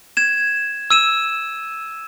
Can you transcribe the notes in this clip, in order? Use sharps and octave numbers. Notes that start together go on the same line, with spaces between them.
G#6 E7
E6 D#7 E7